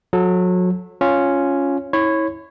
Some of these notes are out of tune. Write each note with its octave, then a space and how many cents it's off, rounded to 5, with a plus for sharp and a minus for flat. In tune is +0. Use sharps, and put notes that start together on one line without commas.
F#3 -30 A4 -15
C#4 +0 F4 +0
E4 -30 C#5 -15 B5 +25